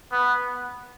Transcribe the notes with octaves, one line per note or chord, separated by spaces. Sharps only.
B3